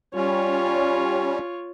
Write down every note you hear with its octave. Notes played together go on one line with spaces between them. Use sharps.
G3 C#4 F4 C#5